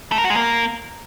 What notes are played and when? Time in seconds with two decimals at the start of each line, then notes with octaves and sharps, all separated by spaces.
0.12 A3
0.18 A#4
0.24 F#4
0.30 G#3
0.36 A#3